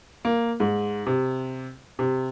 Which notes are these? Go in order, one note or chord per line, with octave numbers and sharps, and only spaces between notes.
A#3
G#2
C3
C3